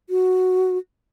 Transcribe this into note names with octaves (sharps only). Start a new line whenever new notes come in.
F#4